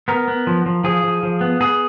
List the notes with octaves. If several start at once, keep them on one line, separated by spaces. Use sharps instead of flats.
B3 A#4
B3
F3
F3
F3 G#4
F3
F3
B3
B3 G#4